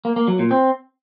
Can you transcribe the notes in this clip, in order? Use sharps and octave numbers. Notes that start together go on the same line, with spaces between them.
A#3
A#3
F#3
A#2
C4